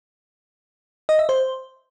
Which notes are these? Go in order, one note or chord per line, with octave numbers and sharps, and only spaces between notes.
D#5
E5
C5